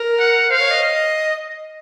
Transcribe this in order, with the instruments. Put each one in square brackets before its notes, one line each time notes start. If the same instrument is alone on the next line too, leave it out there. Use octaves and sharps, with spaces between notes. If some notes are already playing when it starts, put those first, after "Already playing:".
Already playing: [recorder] A#4
[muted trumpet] F#5
[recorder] C5 [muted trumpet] F5
[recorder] C#5
D#5